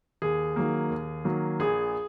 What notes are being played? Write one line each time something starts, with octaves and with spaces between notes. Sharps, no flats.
D#2 G#4
D#3 F#3 A#3
D#2
D#3 F#3 A#3
A#1 G#4